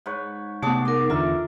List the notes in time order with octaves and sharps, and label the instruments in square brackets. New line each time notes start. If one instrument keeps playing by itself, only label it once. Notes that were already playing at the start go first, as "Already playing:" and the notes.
[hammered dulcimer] G#2 B4 C#5
[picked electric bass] C3 B3 [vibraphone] A3 A5 [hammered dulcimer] D4 G#4 C#5
[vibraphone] D#4 A#4 [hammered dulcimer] D6
[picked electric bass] E2 D3 [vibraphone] F4 E5 [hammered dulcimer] A4 A#4